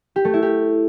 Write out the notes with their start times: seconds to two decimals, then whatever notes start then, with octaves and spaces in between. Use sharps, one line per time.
0.16 G4
0.25 A3
0.34 E4
0.42 G4